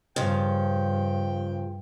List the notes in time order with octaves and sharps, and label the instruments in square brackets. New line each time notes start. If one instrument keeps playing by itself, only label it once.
[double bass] G2 [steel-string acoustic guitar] C#3 F3 [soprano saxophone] G5